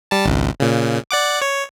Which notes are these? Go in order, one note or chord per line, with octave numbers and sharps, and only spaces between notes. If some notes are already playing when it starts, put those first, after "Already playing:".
G3 A5
G#1 C#2
A#2 C#3
D5 F#5 D6
C#5